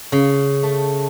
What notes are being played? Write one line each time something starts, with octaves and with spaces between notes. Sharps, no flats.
C#3
A3